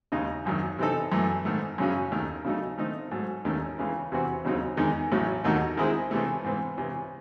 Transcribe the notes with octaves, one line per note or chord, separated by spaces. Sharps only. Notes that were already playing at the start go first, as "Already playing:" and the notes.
D#2 C#3 G#3 D#4
G#1 F#2 D#3
C3 E3 C4 D#4 A4
F#2 E3 A3
G#2 D#3 A3
F#2 C#3 F#3 C#4
D#2 D#3 A3
C#3 F#3 A3 D#4
D#3 A3 C4 D#4
G#2 F#3 A3
D#2 D#3 A3 C#4
C#2 C#3 E3 G#3
E2 C3 E3 C4 F#4
D#2 C#3 F#3 C4 D#4
E2 D#3 G#3 D#4
A1 A2 F#3
D#2 D#3 A3 D#4 F#4
D#3 G#3 C4 E4 G#4
C#2 C3 E3 A3
G#2 E3 C4
C#2 C3 E3